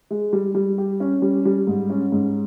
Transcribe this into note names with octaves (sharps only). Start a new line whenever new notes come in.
G#3
G3
G3
G4
C#4
G3
G3
G#2
C#4
G#2